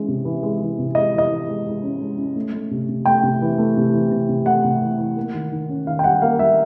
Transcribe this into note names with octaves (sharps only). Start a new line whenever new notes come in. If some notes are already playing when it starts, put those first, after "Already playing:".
Already playing: E3 G#3 C#4
C3
E3
G#3
E3
C3
G#3 D#5
E3
D#5
E3
G#3
G#3
C#4
G#3
C#4
A3
A3
C3
C3
A3 G5
C3
E3
A3
C3
E3
C3
C3
A3 F#5
C3
E3
E3
A#3
D#3
D#3
C#4
D#3 F5
G5
G3 F#5
A#3 F5
G3 E5